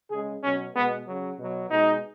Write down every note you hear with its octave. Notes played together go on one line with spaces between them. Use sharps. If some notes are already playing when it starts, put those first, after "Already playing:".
C#3 G#3 G#4
B2 F#3 C#4
B2 G#3 B3
C#3 F#3
B2 F#3
B2 G#3 D#4